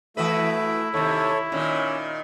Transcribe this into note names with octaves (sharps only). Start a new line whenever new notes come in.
E3 A3 E4 F#4 B4 E5
D#2 C3 A4 C#5
A#2 D#3 C#4